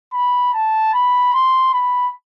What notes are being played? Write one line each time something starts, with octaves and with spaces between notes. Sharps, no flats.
B5
A5
B5
C6
B5